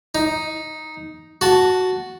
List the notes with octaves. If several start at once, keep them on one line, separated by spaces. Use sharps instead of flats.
D#4
F#4 A5